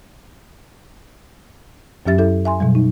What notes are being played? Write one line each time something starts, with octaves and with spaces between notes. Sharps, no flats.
F#2 F#3 C#4 G4 E5 A6
E4 A4 E5
E5 G#5 C6
B2 F#3 G3
D#4